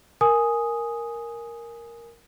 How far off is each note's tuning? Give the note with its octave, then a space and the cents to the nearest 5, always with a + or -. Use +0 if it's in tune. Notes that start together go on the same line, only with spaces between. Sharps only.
A#4 +0 G#5 +0 D#6 +0